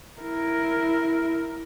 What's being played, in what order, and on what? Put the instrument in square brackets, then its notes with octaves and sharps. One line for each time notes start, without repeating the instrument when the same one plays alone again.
[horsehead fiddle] E4 A#4